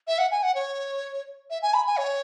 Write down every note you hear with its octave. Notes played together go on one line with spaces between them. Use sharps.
E5
F#5
G#5
F#5
C#5
E5
G#5
B5
G#5
C#5